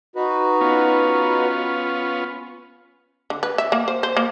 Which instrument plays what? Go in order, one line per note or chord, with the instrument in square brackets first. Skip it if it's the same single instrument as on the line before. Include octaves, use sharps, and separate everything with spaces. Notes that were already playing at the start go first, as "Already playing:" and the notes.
[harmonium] D#4 F#4 B4
[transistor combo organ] B3 C#4 F4
[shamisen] D3
B4
E5
A#3
C5
C5
A#3